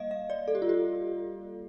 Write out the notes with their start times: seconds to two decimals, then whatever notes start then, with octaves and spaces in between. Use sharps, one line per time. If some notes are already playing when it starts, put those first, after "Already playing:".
Already playing: G3 A#3 D#5 F5
0.11 F5
0.30 D5
0.48 A4
0.55 G4
0.62 F4
0.69 G4